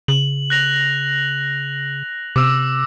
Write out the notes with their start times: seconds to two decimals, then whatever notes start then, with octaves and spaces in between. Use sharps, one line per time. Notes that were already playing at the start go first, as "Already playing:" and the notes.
0.08 C#3 F#7
0.50 F#6 A#6 F7
2.36 C3 D6 E6